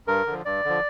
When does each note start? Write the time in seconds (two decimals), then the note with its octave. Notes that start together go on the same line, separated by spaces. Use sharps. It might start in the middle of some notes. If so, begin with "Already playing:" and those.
0.07 G2 A#4
0.27 D3 F3
0.45 G2 D5
0.65 D3 F3